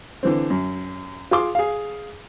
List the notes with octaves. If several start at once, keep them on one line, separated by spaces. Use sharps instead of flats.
D3 E3 C4
F#2
F4 G#4 C6 D6
G#4 F5